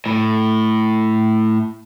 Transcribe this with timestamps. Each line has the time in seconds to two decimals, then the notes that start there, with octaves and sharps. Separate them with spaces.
0.06 A2